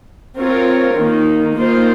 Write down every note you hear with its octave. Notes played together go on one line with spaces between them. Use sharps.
C4 F4 A#4 C#5
D#3 A#3 D#4
D#3 A#3 F4 C5